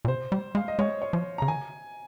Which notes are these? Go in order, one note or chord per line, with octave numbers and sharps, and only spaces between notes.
A#2
C3 C5
G3
G#3 F5
D#5
G#3 C#5
C#5
F3
C#3 A#5
D#3 G#5